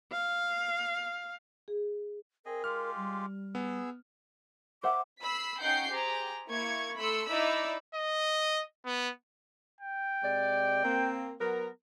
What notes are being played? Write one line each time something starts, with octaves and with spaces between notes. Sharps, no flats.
F5
G#4
C4 G#4 A#4 D#5
G#3 F4 G4 F6
G3
B3 G#4 E6
C5 E5 F#5 D6
B5 E6 B6 C7
C#4 D#4 F#5 G5 G6 C7
G4 G#4 C5 A#5
A#3 E4 C#6 G#6
A3 B5 C6 E6 C#7
D#4 E4 D5 E5 B5 E6
D#5
B3
G5
C3 G#3 D5
A#3 C4
F#3 B3 A#4